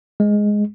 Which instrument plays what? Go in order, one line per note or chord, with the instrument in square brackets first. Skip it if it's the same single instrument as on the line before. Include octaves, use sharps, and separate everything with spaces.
[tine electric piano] G#3